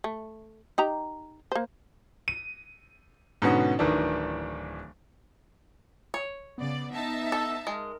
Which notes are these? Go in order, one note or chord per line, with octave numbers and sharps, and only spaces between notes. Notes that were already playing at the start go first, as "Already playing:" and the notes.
A3
D#4 G4 A#5
A#3 C5
D#7
G#2 B2 D3 B3 C#4 F#4
D1 D#3 E3 D4
C#5
C#3 B3 D5
D#4 E5 A5
A4
G#3 A#4